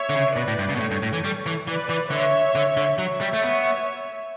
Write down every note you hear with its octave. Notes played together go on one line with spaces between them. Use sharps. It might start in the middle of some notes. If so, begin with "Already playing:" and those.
Already playing: C#5 E5
D3
C#3
B2 B4 D5
A2
G2
C#3
B2
A2 A4 C#5
G2
A2
E3
G3
E3
E3 B4 D5
E3
D3 C#5 E5
D3
D3
F#3 C#5 E5
G3
A3
B3